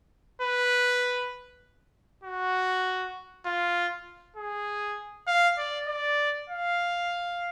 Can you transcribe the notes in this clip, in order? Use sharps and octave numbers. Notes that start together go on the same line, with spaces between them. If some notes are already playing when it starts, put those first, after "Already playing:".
B4
F#4
F4
G#4
F5
D5
D5
F5